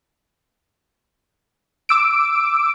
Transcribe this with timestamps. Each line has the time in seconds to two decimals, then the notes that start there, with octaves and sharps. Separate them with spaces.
1.89 D6 E6 D7